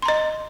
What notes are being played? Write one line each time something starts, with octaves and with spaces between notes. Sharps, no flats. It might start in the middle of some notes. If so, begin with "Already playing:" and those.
D#5 A#5 C6